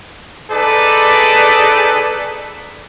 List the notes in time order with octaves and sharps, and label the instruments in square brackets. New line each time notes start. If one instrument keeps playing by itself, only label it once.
[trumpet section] D#4 G#4 A4 B4 D5